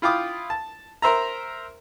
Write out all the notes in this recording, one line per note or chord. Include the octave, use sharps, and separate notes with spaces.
E4 F4 F5 G5 D6 D#6
A5
A#4 C5 E5 A#5